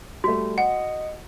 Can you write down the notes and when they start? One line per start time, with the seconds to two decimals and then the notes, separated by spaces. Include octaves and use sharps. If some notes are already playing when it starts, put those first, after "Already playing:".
0.24 G3 A3 F#4
0.58 D#5 F#5 C#7